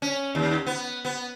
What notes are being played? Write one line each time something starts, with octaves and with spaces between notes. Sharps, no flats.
C#4
D#2
B3
B3